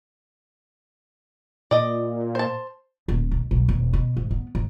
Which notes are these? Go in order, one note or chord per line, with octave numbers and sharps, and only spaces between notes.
A#2 D5 D#5
C5 A5
D#1
B1
B1
E1
B2
G#2
B3
G#2